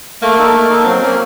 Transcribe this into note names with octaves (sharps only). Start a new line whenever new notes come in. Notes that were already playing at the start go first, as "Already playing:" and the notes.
A3 A#3
D#4 A4
A3
D#4 A4
F#3 C4
A#3 C#4